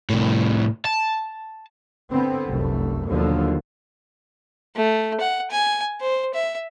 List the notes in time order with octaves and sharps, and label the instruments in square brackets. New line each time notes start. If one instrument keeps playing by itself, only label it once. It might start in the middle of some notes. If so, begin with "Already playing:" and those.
[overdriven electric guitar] C2 A2
A5
[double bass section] D3 B3 C4
F1 C2 F#2 A3
D#2 B2 D3 F3 F#3
[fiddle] A3
F#5
G#5
C5
E5